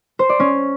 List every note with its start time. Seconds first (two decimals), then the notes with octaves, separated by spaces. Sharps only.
0.19 C5
0.29 D5
0.40 C#4